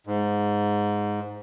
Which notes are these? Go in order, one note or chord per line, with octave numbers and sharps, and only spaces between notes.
G#2